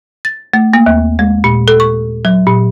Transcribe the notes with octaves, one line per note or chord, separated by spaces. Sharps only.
A6
A3
A#3
D#2
G#3
A#2
A4
C#6
F#3
A#2